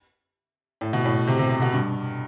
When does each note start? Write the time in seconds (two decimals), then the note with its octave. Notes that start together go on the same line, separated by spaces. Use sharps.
0.81 A2
0.93 B2
1.05 A2
1.27 C3
1.39 C3
1.50 C3
1.62 B2
1.73 G2